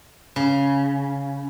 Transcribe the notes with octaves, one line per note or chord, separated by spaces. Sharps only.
C#3